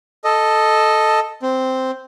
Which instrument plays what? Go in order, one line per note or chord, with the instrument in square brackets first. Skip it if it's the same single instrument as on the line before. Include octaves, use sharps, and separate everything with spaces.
[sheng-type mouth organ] A4 D#5
C4